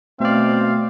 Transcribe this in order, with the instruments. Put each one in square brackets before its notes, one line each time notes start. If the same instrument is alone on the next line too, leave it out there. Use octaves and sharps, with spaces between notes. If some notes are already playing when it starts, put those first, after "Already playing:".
[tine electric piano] B2 D5 [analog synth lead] A3 [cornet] C4 [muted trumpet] F5